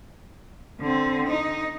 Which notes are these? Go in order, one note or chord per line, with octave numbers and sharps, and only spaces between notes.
D3 C4
D#4